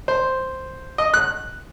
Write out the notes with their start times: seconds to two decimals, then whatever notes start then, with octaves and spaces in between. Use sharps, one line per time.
0.08 C5
0.98 D#5
1.14 F#6